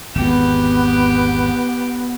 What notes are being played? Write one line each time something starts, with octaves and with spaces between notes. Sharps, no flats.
G#1 E2 B3 G4